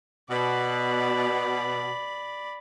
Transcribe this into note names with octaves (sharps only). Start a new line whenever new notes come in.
B2 D5 B5